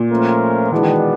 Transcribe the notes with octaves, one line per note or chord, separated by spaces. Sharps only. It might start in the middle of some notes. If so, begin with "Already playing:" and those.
Already playing: A#2
F3 A3 C#4 F4 A#4
B2 E3 G#3 B3 D4
D#3